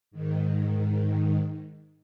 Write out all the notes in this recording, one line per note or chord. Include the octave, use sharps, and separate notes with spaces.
G#2 D#3